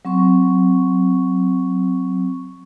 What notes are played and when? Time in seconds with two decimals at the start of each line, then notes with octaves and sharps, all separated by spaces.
0.05 F#3 C4 C#6